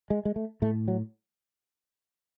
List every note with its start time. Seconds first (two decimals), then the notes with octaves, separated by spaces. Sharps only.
0.10 G#3
0.25 G#3
0.36 A3
0.62 A2 A3
0.88 F#3